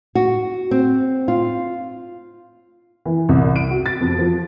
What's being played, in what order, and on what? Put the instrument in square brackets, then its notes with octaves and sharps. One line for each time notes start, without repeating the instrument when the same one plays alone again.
[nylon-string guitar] F#4
C4
F4
[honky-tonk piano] E3
C2
D7
F#4
A6
F2
F3